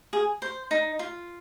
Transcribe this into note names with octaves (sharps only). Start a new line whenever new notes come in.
G#4
C5
D#4
F4